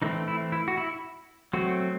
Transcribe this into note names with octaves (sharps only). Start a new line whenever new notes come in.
E3 A3 C4 D#4
E4
E4
F#4
E4
F#3 A3 C4 F#4